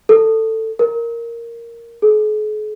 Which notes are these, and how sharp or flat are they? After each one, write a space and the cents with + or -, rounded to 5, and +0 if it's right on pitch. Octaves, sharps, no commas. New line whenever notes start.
A4 +15
A#4 -5
G#4 +45